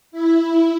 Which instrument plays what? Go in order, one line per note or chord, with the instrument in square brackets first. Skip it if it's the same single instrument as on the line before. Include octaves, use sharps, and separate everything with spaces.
[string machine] E4